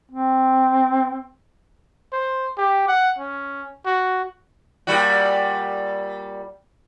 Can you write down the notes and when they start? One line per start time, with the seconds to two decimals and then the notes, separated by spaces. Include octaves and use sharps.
0.12 C4
2.13 C5
2.58 G4
2.88 F#5
3.19 C#4
3.86 F#4
4.87 A#2 G3 F#4